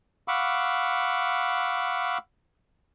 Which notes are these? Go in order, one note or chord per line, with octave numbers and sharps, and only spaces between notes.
F5 F#5 B5 C#6 D6 E6